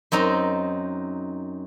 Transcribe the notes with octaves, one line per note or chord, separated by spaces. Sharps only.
F#2 C4 D#4 A#5